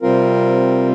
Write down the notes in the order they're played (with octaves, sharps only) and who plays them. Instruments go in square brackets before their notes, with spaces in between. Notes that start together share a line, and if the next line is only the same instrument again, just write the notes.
[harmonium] C3 G3 C4 F4 A#4